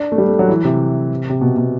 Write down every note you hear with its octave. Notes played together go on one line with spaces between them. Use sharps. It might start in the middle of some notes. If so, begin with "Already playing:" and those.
Already playing: D4
A3
G3
A3
F#3
E3
C3
C3
B2
B2